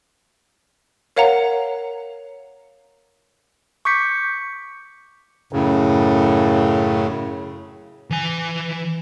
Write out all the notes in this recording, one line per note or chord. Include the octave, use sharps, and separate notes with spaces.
A#4 C#5 F5 F#5 A#5
C#6 D6 G6 B6 C#7
F#2 A2 C#3
E3 G#5